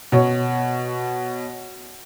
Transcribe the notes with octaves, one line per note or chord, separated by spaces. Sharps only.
B2 C#5